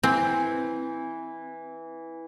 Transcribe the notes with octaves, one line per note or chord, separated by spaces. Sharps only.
E3 C4